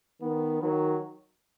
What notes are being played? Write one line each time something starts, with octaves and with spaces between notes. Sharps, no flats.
D#3 B3
D#3 F#3